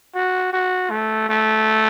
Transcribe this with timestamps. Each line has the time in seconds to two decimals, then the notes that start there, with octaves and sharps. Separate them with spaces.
0.15 F#4
0.53 F#4
0.90 A3
1.29 A3